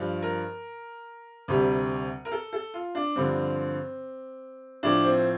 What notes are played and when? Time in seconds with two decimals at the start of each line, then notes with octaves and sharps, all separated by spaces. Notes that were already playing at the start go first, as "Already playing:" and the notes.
Already playing: G2 F3
0.22 A#4
1.48 D2 C3 G3
2.25 A#4
2.32 A4
2.53 A4
2.74 F4
2.95 D4
3.16 G2 D3 F3 C4
4.83 A2 F3 D4
5.04 C4